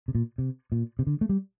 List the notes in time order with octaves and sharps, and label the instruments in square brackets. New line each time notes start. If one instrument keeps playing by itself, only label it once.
[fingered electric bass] C3
A#2
C3
A#2
C3
D3
A3
G3